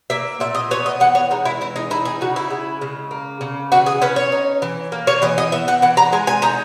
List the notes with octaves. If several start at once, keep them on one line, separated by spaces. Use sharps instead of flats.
A#3 E5
A#2 E5
D#5
B3 C#5
D#5
E3 F#5
C#5
G#3 D#4
E4
E3 E4
D#4
D#4 E4
G#4
C#3 F#4
E4
G#3
C#3
A#3
C#3
E3 F#4
G#4
C#4 B4
C#5
D#4
E3
A#3
C#5
E3 D#5
D#5
B3 E5
F#5
E3 F#5
A#5
G#3 G#5
G#5
D#4 A#5